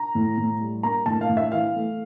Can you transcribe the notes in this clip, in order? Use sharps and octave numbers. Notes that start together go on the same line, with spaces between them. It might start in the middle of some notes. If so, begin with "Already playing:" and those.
Already playing: A#5
A2
A2
G3
A#3 A#5
A2 A5
F5
A2
E5
E3 F5
A3